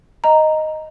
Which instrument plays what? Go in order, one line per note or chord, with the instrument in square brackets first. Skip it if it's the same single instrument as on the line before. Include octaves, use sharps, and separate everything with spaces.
[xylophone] D#5 A#5